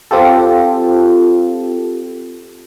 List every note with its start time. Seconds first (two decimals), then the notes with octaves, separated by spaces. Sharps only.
0.11 C4 F4 G4 A4